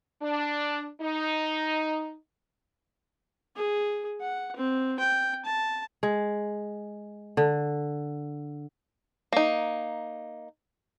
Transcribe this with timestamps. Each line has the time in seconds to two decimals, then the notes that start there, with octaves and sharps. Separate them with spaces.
0.22 D4
1.02 D#4
3.56 G#4
4.21 F#5
4.56 C4
4.99 G5
5.45 A5
6.03 G#3
7.37 D3
9.32 A#3 D#4